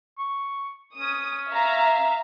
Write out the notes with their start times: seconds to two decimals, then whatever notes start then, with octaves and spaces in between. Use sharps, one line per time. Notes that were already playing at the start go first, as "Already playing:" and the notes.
0.18 C#6
0.97 C#4 D#6
1.50 E5 F5 A#5